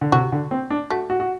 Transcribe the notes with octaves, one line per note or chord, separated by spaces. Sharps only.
D3
C3 F#4
D3
C4
D4
A3 F#4
F#4
F#4